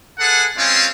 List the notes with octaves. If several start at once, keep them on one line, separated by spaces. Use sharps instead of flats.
G#4 A4 B4 F#5
G#3 C4 C#4 F4